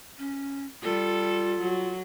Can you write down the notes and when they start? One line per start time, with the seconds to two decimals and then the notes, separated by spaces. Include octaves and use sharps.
0.19 C#4
0.83 G3 F4 A4
1.59 F#3